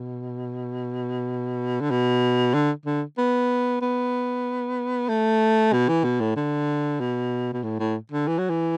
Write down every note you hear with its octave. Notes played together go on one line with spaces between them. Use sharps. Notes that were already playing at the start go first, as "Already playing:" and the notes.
Already playing: B2
D3
B2
D3
D3
B3
B3
A3
B2
E3
B2
A2
D3
B2
B2
A2
A2
D3
E3
F#3
E3